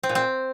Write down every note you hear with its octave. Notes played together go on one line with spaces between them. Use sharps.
C4
A#2
C4